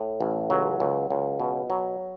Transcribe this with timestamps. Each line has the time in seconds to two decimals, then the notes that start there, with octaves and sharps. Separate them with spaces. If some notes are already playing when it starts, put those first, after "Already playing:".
Already playing: A2
0.21 A1
0.50 C#2 F#3
0.80 C#2
1.10 C#2
1.40 B2
1.70 F#3